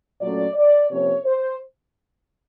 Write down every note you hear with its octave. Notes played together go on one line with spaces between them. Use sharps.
A#2 F#3 A3 C#4 D5
D5
C3 F3 A#3 C#4 C#5
C5